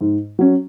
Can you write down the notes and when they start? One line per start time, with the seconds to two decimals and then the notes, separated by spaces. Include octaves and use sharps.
0.01 G#2
0.39 F#3 C#4